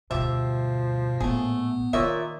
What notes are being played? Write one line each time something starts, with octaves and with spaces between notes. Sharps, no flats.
D2 G2 B2 F3 G4 E5
A#1 A2 A3 B3 G#4
A#2 D#3 C#5 D#5 E5